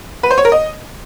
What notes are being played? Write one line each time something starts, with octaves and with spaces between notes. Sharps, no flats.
B4
C5
C#5
A#4
D#5